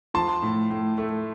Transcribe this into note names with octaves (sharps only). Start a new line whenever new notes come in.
F3 A5 C6
A2
A2
A3